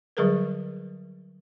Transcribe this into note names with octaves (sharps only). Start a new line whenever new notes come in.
D3 F#3 G3 G#4 A#4 B4